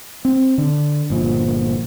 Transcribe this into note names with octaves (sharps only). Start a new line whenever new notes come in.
C4
D3
G1 A#2 F3